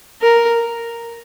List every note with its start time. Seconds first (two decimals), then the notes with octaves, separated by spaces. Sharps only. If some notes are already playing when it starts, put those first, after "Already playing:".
0.22 A#4